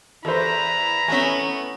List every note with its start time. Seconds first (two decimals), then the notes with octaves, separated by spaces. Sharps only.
0.25 E2 E4 A4 B4 C5 A#5
1.08 A3 B3 C#4 E5 G#5